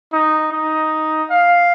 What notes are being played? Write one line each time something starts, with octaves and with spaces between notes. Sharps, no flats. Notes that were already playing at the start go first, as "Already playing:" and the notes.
D#4
D#4
F5